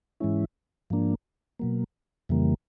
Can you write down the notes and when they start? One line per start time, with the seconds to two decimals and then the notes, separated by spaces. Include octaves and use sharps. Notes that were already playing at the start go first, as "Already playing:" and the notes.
0.20 G#2 E3 G#3 C#4 E4
0.90 G#2 F3 A#3 D4
1.59 B2 F#3 A#3
2.29 F2 C#3 E3 G3 A#3